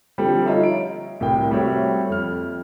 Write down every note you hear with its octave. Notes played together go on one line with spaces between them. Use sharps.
D3 F3 G3 C4 G4 A4
D#4 F4 C#5 E5 A#5
D7
C2 A2 A#4 G5
G3 A3 C4 F#4 C#5 E5
F2 F6